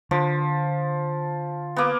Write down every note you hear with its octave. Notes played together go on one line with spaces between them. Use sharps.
D3 F3
A#3 B3